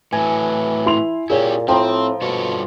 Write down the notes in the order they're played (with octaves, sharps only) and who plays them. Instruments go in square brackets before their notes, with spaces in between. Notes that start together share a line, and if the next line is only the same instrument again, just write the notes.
[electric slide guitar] A2 F#3 [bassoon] E3 [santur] G#5
[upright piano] E4 C6 F7
[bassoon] A#2 [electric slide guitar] E4 G4 [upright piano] G#4 C#5
[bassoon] A2 [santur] F3 [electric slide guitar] C4 [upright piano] G5 A#5
[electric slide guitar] G2 A4 C#5 [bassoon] B2